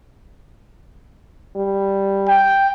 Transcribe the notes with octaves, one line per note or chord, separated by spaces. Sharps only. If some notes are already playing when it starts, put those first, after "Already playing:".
G3
G5